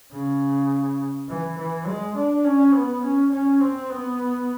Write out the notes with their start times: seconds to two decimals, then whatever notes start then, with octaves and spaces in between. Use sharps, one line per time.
0.12 C#3
1.29 E3
1.58 E3
1.87 G#3
2.15 D4
2.44 C#4
2.73 B3
3.03 C#4
3.31 C#4
3.60 C4
3.89 B3